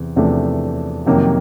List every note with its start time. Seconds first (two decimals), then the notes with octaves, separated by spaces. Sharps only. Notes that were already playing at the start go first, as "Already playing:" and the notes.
Already playing: E2 C3
0.16 E2 C3 F3 A3 D4
1.06 F2 C3 D#3 F#3 A#3